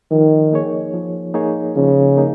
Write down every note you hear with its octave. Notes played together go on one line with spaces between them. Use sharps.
D#3 F3
A#3 D#4 G#4 C#5
F3
A#3 D#4 G#4 C#5
C#3 F3
A#3 D#4 G#4